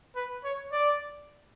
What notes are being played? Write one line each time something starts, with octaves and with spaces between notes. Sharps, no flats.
B4
C#5
D5